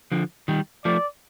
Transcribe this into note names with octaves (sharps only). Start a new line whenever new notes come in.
D3 F3
D#3 G3
F3 A3 D5